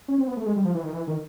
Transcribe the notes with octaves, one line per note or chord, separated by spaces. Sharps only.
C#4
C4
B3
A3
G#3
G3
F3
E3
D#3
E3
D#3